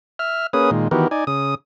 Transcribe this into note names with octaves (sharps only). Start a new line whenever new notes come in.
E5 F6
A#3 C#4 G#4 B4 D#6
A#2 D#3 G#3
D#3 E3 B3 F#4 G4 A#4
D#4 D5 G#5
C#3 D#6